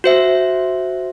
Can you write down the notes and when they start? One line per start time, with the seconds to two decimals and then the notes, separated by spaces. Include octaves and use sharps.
0.04 F#4 C5 E5